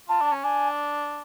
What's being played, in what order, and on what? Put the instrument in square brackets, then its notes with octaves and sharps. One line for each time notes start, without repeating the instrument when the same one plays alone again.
[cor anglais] F4 [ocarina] A5
[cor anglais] D4
C#4
[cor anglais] D4 [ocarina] G#5